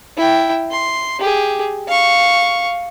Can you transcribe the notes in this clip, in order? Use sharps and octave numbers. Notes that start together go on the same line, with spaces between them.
E4 G5
C6
G4 G#4
F5 C#6